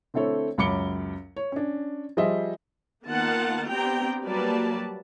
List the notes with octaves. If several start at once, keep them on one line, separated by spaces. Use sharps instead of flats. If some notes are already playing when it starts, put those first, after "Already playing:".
D3 A3 C4 E4 A4 C#5
C#2 F#2 B5 D6 C#7 G7
C#5
C#4 D4
F3 G3 G#4 C5 D#5 E5
D#3 A#3 B3 F4 F#5 A5
B3 C4 D4 G4 G5 A#5
F#3 G3 A#3 B4 D5 A5